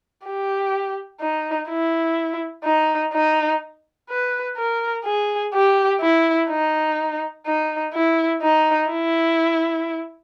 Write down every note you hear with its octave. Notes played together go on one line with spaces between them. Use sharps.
G4
D#4
E4
D#4
D#4
B4
A#4
G#4
G4
E4
D#4
D#4
E4
D#4
E4